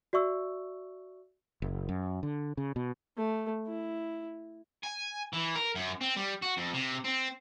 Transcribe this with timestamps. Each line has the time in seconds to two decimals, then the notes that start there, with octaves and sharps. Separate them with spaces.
0.13 F#4 D5 E5 C#6 E6
1.62 F#1
1.89 F#2
2.23 D3
2.57 C#3
2.76 B2
3.17 A3
3.67 E4
4.83 G#5
5.33 E3
5.55 A#4
5.75 F#2
6.01 C4
6.17 G3
6.42 F#4
6.57 F2
6.73 C3
7.04 C4